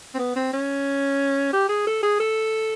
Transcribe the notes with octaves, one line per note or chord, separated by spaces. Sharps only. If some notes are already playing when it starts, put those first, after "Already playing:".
C4
B3
C4
C#4
G4
G#4
A4
G#4
A4